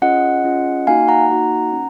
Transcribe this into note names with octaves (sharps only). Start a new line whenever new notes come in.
C#4 F4 G#4 D#5 F#5
C#4 F4 G#4
A#3 D#4 F#4 F5 G#5
F#5 A#5
A#3 D#4 F#4
C#4